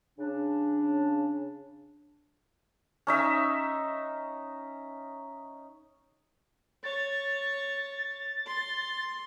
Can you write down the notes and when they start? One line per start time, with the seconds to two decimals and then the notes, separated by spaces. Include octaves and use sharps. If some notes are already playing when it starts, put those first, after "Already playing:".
0.19 C#3 D4
3.07 C#4 D#4 E5
6.84 C#5 A6
8.47 C6